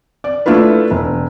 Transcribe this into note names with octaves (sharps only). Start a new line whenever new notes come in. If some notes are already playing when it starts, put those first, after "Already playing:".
D5
A3 D4 E4 F4 B4
E1